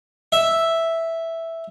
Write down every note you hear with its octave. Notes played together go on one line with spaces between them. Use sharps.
E5